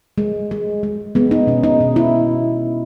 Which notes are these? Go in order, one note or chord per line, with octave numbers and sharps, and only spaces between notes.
G#3
G#3
G#3
G#3 B3
D#4
B2 C#4
D#4
B2
E4